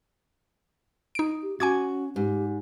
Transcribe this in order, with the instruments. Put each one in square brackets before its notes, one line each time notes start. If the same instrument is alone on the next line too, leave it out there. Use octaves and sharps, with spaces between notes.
[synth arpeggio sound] D#4 D7
[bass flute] G4
[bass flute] C#4 [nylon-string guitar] F#4 [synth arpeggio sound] G#5 D6 G#6
[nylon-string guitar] G#2 [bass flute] G4